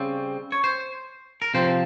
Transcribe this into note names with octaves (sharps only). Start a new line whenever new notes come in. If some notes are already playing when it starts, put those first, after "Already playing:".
Already playing: C#3 G3 C4
C#5
C5
A#4
C3 F3 C4 C5